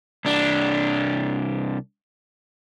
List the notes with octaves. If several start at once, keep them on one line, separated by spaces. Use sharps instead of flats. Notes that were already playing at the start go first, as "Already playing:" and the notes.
C2 D4